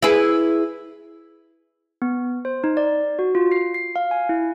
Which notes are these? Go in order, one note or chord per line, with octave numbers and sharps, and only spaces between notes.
E4 G#4 B4
B3
C5
D#4
D5
F#4
F4
C7
C7
F5
G#5
E4